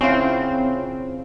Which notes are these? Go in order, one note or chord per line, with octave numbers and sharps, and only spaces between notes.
C#3 C4 C#4 E4 F4 F#5